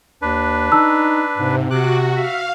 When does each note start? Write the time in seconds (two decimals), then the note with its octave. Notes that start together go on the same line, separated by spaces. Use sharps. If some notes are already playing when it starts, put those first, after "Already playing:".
0.22 D#2 D4 B4
0.72 D#4 A5 E6
1.37 G#2 C3
1.71 C3 F#4 D6 F#6
2.16 E5 F5